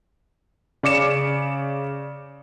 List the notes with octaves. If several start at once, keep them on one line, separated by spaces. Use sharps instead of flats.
C#3 D5 D6 C#7 E7